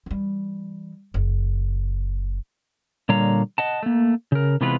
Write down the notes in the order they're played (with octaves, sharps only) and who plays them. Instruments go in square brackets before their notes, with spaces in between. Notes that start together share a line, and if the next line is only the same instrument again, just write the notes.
[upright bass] E3 G3
F#1
[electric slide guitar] A#2 D3 G3 C#5 F5 A#5
D#5 F#5 A5
A3 A#3
C#3 A#4
C3 E3 G#3 B3 F4 B4